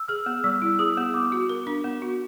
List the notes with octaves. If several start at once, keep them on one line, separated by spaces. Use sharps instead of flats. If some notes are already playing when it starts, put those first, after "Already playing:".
Already playing: E6
G#4 F6
B3
G3 E6
E4
G#4 D#6
B3
B3 D6
F#4
A#4
D4
B3
F#4